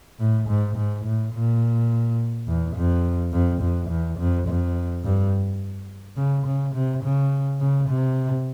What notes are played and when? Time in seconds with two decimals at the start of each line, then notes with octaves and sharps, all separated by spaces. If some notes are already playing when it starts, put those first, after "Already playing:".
0.19 A2
0.48 G#2
0.76 G#2
1.04 A2
1.33 A#2
2.47 E2
2.75 F2
3.32 F2
3.61 F2
3.89 E2
4.18 F2
4.47 F2
5.04 G2
6.17 C#3
6.46 C#3
6.74 C3
7.03 C#3
7.60 C#3
7.88 C3